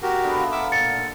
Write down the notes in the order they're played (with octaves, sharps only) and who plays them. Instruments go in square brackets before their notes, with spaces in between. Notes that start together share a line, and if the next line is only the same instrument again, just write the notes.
[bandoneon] F#4 G4 A#4
[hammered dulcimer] D3 B3
F4 E5
[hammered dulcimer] A#4 F#5 A5 [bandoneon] E5 D6 E6
[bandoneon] A#2 [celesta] A6 C#7